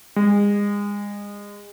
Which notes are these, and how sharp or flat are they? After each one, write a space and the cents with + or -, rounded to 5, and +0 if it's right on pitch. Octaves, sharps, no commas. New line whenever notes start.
G#3 -30